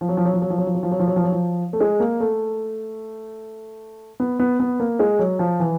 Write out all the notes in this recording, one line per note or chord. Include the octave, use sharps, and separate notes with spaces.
F3
F#3
F3
F#3
F3
F#3
F3
F#3
F3
F#3
F3
F#3
F3
F#3
F3
F#3
F3
A3
G#3
A#3
A3
B3
B3
B3
A#3
G#3
F#3
F3
E3